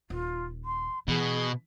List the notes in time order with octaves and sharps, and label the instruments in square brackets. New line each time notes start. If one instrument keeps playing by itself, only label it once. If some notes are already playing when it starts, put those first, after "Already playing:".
[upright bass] D#1 [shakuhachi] F4
[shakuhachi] C6
[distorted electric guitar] B2 [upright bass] E3 [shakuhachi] G#4